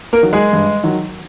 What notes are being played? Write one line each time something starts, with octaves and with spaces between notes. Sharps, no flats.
A#3 A#4
D#3 F#3
G#3 G#4
G2
D#3 F#3